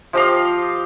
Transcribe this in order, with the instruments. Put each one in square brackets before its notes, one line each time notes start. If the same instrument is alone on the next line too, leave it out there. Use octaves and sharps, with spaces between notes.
[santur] F3 G4 D#5 F5